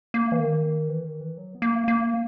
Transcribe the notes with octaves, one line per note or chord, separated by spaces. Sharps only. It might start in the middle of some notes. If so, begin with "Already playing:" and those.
A#3
E3
D#3
E3
D#3
E3
F#3
B3
A#3
A#3